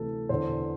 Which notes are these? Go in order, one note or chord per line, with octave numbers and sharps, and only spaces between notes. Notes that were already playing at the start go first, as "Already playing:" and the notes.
Already playing: D2 C3 E3 A4
E2 D3 C5